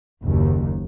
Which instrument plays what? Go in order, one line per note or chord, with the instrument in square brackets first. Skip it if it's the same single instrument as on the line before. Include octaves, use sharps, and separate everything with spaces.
[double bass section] F#1 D#2